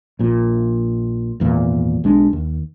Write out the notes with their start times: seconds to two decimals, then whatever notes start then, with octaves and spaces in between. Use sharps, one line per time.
0.19 A#1 A#2
1.40 G#1 E2 A#2
2.04 B1 G#3 D4
2.33 D#2